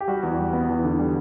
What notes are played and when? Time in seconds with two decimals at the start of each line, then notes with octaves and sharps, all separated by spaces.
0.01 G4
0.08 G3 F#4
0.23 E2
0.39 G3
0.53 B3
0.69 E2
0.85 D3
0.99 G3